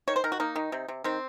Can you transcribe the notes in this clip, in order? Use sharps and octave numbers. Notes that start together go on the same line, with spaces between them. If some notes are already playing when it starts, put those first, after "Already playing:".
D#3 C#5
C5
D#3 A#4
F#4
A#3 D#4
D#3
C3
C3
D#3 C4